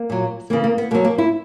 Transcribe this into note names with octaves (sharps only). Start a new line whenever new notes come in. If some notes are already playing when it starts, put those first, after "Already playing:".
Already playing: A#3
A#2 F#3
C#3 E3 A#3
A#3
B3
B2 F#3 A#3
A#3
E4